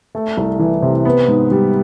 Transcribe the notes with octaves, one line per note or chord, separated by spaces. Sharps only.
A3
C2
E3
C3
B3
G#2
G3